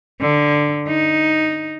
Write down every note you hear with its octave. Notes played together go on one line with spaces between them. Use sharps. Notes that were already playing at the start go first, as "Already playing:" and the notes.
D3
D#4